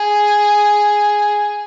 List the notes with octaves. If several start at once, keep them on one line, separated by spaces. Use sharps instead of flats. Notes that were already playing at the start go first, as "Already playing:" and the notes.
Already playing: G#4